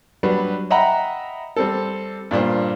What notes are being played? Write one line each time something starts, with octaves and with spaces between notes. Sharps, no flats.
F#3 G3 D4 B4
D#5 E5 F#5 G5 A#5 B5
G3 C4 A4
G2 A#2 D4 C5